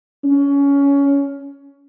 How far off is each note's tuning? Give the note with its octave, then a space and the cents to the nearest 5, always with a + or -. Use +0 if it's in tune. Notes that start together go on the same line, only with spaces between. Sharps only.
C#4 +20